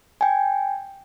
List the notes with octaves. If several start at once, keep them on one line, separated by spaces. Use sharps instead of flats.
G5 G#5